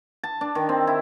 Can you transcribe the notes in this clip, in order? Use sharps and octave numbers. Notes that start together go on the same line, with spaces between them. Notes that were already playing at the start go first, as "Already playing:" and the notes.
A5
D4
D#3
C4
E4